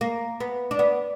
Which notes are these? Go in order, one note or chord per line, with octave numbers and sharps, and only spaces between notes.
A#3
B3
D4
B3